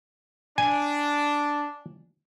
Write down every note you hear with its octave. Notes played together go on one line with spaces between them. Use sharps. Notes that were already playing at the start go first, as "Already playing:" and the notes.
D4 G#5